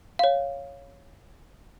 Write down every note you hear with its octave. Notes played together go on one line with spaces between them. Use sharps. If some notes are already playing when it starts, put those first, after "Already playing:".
C#5 F5